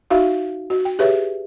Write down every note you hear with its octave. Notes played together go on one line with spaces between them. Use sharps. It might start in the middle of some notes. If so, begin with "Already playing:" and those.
D#4 F#4 E5 F5
F#4
G5
G4 G#4 B4 C#5 E5